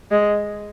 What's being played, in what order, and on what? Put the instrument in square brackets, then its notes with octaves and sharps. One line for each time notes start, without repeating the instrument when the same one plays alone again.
[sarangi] G#3